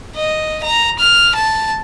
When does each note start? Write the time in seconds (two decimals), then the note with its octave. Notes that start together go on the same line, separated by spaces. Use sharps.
0.16 D#5
0.63 A#5
0.99 F6
1.35 A5